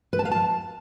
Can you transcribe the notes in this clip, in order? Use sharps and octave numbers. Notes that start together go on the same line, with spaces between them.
B4
A5
F5
A5